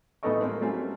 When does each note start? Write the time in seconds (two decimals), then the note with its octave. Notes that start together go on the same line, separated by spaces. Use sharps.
0.23 A1 B3 D#4 A4 D#5 C#6
0.42 G3 A#3 C4
0.61 F#3 G3 A3 C4 C#4